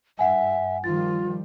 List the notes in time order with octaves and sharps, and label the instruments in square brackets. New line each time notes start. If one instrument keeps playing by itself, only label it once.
[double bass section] G2 [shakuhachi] E5 [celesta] F#5 G#5
[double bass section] D#3 F3 G3 [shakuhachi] F4 [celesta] A6